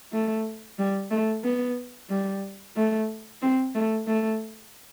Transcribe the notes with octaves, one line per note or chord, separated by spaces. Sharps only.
A3
G3
A3
B3
G3
A3
C4
A3
A3